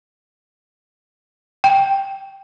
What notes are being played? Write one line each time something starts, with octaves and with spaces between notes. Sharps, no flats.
G5